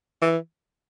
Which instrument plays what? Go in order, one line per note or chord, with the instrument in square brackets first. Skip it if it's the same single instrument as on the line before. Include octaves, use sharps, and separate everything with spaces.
[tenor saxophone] E3